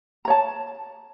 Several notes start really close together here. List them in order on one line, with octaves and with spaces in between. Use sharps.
A#5 C#5 A5